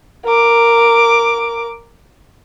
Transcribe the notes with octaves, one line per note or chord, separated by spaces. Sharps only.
A#4 D6